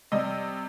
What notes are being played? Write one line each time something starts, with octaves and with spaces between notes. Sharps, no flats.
C3 G3 D#5